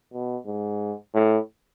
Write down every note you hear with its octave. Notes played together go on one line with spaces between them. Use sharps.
B2
G#2
A2